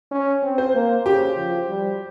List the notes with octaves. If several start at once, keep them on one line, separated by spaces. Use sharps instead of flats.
C#4
C4
C5
A#3
C#3 G4
F3
G3